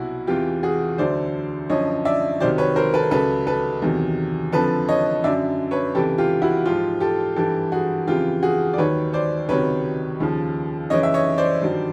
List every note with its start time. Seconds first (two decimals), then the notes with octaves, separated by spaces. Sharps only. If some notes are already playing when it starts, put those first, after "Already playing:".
Already playing: C2 B2 F#3 E4 F#4
0.27 E2 C3 E3 F4 G4
0.63 F#4 G#4
0.98 D2 D3 F#3 C5 D5
1.70 F#2 D3 F3 C#5 D#5
2.05 D5 E5
2.40 C2 C3 D#3 F#3 C5 D5
2.58 B4 C#5
2.76 A#4 C5
2.94 A4 B4
3.11 C#2 C#3 F#3 A4 B4
3.47 A4 B4
3.82 E2 C3 D#3 F#3
4.52 F2 D3 F3 A4 B4
4.88 C#5 D#5
5.24 F#2 D3 F#3 D5 E5
5.71 B4 C#5
5.95 C#2 C3 E3 G4 A4
6.18 F4 G4
6.42 E4 F#4
6.65 G#2 F3 F4 G4
7.00 G4 A4
7.36 G2 E3 G4 A4
7.72 F#4 G#4
8.07 F2 C#3 E3 F4 G4
8.43 F#4 G#4
8.73 D5
8.78 D#2 D#3 F#3 B4 C#5
9.13 C5 D5
9.49 C#2 C3 D#3 F#3 B4 C#5
10.20 D#2 C#3 F3
10.90 F#2 C#3 E3 C#5 D#5
11.03 E5
11.14 C#5 D#5
11.38 C5 D5
11.62 G2 D#3 F#3